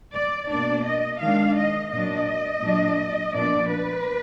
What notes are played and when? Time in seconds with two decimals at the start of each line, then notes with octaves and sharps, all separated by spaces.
0.15 D5
0.50 B2 A#3 D4 D5
0.86 D#5
1.21 D#3 G#3 D4 F5
1.57 D#5
1.92 A#2 F#3 D4 D#5
2.64 A#2 F#3 D4
3.34 A#2 F3 B3 D4 D5
3.70 B4